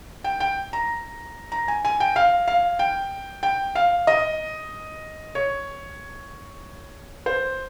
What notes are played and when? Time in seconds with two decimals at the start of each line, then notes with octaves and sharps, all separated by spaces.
0.24 G5
0.40 G5
0.73 A#5
1.52 A#5
1.68 G#5
1.85 G#5
2.00 G5
2.16 F5
2.48 F5
2.79 G5
3.43 G5
3.75 F5
4.07 D#5
5.35 C#5
7.26 C5